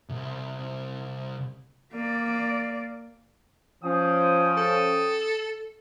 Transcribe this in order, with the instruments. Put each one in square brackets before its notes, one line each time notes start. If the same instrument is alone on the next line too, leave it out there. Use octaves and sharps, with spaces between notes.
[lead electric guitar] C2
[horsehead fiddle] A#3 D5
[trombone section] F3 C#4 [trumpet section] G5 D#6
[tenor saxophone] A4